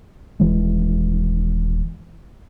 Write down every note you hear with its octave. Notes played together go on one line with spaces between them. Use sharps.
D#1 E3 G#3